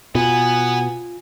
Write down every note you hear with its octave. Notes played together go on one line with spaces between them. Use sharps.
B2 B3 F4 G#5